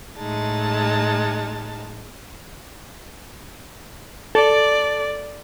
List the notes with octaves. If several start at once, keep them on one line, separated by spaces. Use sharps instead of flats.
A2 G#3 D#4 A5
A4 D5